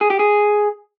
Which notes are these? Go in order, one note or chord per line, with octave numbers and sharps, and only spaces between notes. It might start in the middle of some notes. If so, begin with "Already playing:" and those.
G#4
G4
G#4